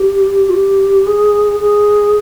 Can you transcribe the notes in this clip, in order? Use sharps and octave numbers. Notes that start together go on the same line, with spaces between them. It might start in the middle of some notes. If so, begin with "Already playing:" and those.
Already playing: G4
F4
G4
G#4
G#4